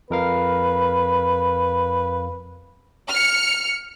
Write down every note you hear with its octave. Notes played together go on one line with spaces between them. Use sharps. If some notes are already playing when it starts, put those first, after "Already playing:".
F2 A#4 B4 F5
F6 C#7